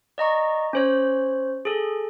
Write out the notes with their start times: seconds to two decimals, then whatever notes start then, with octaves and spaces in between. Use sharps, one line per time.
0.18 D5 D#5 A#5 C#6
0.73 C#4 C5 C#5
1.65 G#4 A4